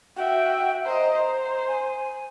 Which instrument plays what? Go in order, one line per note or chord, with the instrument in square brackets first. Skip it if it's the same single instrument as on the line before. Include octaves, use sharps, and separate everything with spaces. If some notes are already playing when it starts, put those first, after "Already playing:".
[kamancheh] F#4 E5 [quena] G5
[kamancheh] C5 D#5 [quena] A#5
[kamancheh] C5
[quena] G#5